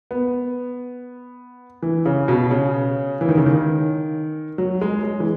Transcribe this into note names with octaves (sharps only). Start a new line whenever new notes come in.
B3
E3
C#3
B2
C#3
E3
D#3
C#3
D#3
F#3
G#3
G#3
E3